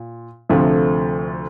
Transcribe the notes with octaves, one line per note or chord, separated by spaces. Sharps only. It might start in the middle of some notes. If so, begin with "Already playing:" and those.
Already playing: A#2
D2 C3 F3 A3